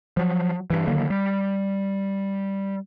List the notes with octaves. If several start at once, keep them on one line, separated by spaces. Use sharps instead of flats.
F3 F#3
G2 E3
D3 D#3 F#3 A#3
G3